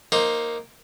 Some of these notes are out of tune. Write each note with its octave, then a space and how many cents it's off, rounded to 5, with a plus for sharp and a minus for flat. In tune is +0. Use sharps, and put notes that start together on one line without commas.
A#3 +0 D#4 +0 C5 +15